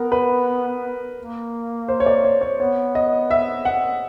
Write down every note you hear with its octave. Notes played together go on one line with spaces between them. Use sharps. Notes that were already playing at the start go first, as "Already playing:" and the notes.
Already playing: B3 A#4
B4
A#3
C5
C#5
D5
C#5
C#5
B3 C#5
D#5
E5
F#5